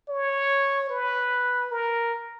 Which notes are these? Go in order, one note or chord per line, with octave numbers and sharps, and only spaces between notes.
C#5
B4
A#4